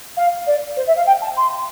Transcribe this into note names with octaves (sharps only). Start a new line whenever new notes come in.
F5
D5
C5
E5
F5
G5
A5
C6